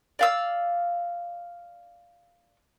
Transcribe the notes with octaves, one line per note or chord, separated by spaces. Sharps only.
D5 F5 E6